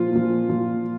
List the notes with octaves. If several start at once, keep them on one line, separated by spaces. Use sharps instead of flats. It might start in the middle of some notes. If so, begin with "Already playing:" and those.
Already playing: A#2 F3 F4
A#2 F3
A#2 F3